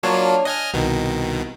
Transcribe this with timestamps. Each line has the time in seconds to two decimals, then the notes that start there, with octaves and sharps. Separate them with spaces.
0.03 F#3 A#3 D4 F4 C#5 A5
0.45 D#5 F#5 G#5 F6
0.74 C2 B2 D#3